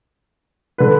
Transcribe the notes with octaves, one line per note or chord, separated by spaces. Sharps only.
D3 B4